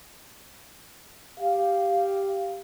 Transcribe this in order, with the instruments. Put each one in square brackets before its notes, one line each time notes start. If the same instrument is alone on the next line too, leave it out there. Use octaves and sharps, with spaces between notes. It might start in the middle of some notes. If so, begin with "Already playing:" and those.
[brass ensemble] G4 F5